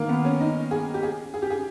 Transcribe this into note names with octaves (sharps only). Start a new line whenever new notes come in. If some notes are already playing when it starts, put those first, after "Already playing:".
Already playing: D#3 A#3
B3
C#4
D#4
G#4
G4
G#4
G#4
G4
G#4